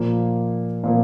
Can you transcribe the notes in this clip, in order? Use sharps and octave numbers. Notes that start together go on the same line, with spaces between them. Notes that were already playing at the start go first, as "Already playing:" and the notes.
Already playing: A#2 F3 A#3
A#2 F3 A#3